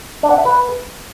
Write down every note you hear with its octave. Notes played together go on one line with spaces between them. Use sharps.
D4
F#5
E5
B4